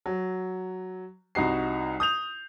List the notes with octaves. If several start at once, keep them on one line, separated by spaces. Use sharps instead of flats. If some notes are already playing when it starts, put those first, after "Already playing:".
F#3
C2 D#4 F#4 C7
D#6 G6 F7